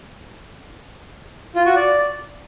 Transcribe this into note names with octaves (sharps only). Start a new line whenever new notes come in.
F4
F#4
D5